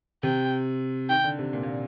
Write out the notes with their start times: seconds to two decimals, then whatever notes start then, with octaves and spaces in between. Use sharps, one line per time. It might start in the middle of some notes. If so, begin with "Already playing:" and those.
0.23 C3 G5
1.09 D#3 G5
1.24 D3
1.39 C3
1.53 A#2
1.63 A#2